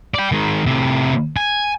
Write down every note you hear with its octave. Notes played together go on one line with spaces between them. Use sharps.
D5 G5
D#3 G#3
A2 C3
G#5